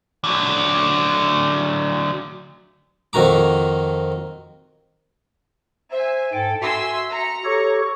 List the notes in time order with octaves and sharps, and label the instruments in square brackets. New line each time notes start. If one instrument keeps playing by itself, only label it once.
[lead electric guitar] D3 F#3
[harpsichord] F2 D#3 F#4 A#5 D6
[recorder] C5 [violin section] E5 G#5
[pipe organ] G#2 G5 [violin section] A4
[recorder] F#4 [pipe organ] E5 [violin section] G#5 C6 E6
[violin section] A#5 C#7
[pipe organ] G4 A4 C#5 [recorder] C#6